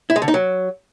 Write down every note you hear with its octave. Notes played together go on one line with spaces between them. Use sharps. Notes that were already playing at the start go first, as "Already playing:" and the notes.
E4
G#3
D3
D#4
F#3